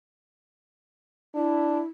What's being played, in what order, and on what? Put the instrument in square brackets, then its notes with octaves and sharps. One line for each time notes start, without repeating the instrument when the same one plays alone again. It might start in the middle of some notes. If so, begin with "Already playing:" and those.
[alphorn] D4 [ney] E4